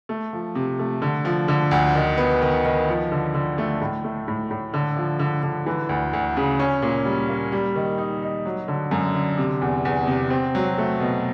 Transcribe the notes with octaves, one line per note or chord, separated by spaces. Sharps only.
A3
F3
C3
A3
D3
F3
D3
D2
D#3
B3
D#3
D#3
F3
D3
D3
A3
A2
A3
A2
A2
D3
F3
D3
D3
E3
D2
D2
C#3
C#4
A#2
G3
A#3
G3
D#3
D#4
D#4
F#3
D3
F#2
D3
C3
E2
E2
C3
C4
F#3
A3
B2